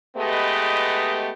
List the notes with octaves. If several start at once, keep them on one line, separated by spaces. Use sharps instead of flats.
G#3 A3 B3 G4 B4 D#5